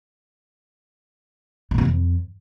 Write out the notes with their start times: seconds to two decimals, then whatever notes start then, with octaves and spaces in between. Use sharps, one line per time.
1.71 A#2
1.78 C3
1.85 F2